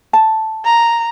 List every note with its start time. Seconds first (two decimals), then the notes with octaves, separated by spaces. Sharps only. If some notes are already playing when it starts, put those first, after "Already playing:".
0.13 A5
0.65 A#5